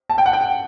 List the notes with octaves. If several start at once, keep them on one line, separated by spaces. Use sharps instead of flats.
A5
G5
F#5
G5